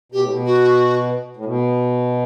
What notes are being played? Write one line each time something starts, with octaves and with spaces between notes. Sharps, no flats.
B2 G4
A2
B2
F#4
A2
B2